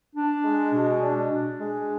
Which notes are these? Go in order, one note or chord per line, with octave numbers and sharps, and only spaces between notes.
D4
G#3
B2
D4
D4
G#3